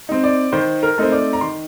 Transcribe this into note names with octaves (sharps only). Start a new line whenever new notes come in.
C4 D#4
D5
D#3 C5
A#4
A3 C4 D#4 C5
D5
A#5
D#3 C6